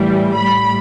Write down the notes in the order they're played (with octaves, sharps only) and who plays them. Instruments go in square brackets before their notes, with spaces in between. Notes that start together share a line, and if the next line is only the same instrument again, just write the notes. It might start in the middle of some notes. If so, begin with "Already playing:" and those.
Already playing: [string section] A2 E3 G3
A2 G3 B5